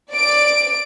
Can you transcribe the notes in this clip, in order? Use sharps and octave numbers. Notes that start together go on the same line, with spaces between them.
D5 D7